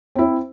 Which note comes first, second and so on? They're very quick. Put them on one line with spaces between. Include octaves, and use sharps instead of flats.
C4 E4 C5